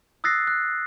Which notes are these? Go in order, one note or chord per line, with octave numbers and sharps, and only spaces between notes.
D#6 E6 F#6 A6 A#6 C7
F#6